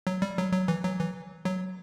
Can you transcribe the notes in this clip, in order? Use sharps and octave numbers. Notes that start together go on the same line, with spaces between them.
F#3
G3
F#3
F#3
E3
F#3
E3
F#3